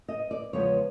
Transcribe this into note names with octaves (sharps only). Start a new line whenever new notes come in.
D#5
D5
E2 C#3 F3 G#3 B3 C#5